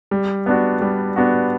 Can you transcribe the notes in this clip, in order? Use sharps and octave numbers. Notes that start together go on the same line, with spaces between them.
G3
B3 D4 F#4
G3
B3 D4 F#4